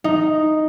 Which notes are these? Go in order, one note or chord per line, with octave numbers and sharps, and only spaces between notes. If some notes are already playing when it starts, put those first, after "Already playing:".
D#4